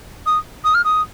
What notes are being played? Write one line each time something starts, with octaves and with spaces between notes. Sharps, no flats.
D#6
D#6
F6
D#6